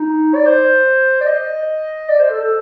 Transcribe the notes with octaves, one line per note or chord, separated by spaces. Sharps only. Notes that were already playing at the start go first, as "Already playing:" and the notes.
Already playing: D#4
D5
C5
D5
D#5
D5
C5
A4
A4